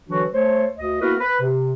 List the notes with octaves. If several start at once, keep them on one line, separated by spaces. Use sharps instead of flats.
D3 E3 F#3 D4 F#4
A3 C5 C#5
D2 D#5
A#3 B3 E4 F#4 A#4 B4
B4
C3